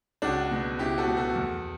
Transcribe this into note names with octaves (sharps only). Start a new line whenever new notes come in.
C#2 D4 F#4
B2
C#2 E4 G4
F#4 A4
B2
F#4 A4
E2